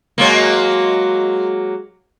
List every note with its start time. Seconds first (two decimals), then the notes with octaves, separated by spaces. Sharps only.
0.18 F#3 G#3 A#3